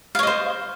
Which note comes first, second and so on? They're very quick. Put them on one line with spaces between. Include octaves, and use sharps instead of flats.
F5 C#5 D#5 C5